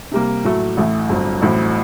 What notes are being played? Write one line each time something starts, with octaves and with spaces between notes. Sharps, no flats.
C3 G3 A#3
A2 F#3 A3
A1 A2 A3
G1 G2 F#3 C4
A1 A2 F#3 C4